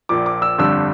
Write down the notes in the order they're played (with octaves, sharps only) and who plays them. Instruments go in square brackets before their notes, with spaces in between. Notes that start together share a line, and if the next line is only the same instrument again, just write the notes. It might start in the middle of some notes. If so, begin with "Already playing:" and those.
[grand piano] A#1 A#2 F3 D6
D6
E6
G1 F2 D3 G3 D4 E6